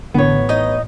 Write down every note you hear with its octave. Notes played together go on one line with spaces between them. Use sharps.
A1 D3 B3 C#5
D#4 D#5 D#6